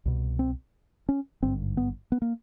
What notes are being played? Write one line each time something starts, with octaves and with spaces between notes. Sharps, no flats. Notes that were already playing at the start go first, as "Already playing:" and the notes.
C2 B2
C4
C#4
G#1 G2 D3 C4
B3
B3
A#3